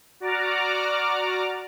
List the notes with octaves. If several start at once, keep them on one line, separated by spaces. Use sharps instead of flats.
F#4 D5 A#5 D6 F6